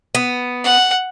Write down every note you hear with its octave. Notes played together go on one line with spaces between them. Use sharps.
B3
F#5